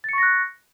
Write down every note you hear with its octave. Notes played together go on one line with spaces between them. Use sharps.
C#6 F#6 A6 A#6 C#7